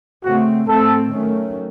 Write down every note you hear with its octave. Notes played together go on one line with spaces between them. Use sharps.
C#3 A3 C4 F#4
A2 A3 C4 A4
D#3 F#3 A3 C#4